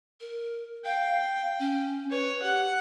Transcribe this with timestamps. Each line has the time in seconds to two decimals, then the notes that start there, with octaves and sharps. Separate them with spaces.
0.21 A#4
0.85 F5 G5
1.59 C#4
2.11 B4 C#5
2.43 G4 F#5